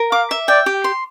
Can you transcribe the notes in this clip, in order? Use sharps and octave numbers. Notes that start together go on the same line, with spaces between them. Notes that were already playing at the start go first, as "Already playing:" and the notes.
Already playing: A#4
F5 D6
E5
D5 G5
G4
C6